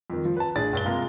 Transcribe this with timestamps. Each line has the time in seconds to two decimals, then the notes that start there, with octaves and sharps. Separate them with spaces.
0.10 F2 D#3
0.25 F3
0.37 B4 A5
0.55 A1 D4 G#4 A6
0.73 G2 A6 G7
0.85 C3 G#3 A#3 F4 A#4